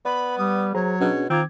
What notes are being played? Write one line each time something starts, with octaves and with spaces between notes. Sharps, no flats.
B3 D5 B5
G3 D#6
F#3 G#4 C5 C#5 A#5
B2 C#4 D4 G#4
D#3 C4 F4 A#5 D6 G#6